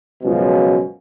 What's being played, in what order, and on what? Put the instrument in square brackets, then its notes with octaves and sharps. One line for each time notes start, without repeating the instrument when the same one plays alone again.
[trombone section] C#2 F#2 B2 F3 C#4